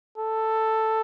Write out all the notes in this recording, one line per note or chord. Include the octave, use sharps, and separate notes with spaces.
A4